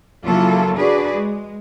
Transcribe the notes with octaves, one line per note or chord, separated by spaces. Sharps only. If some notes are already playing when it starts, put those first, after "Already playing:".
C#3 F#3 A#3 E4 F4 A4
D4 F#4 G#4 B4 D5
G#3